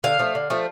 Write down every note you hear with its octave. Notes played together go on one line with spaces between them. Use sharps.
D3 F5
F3 A3
D3
F3 A3